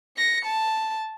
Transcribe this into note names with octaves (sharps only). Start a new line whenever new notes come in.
A#6 C#7
A5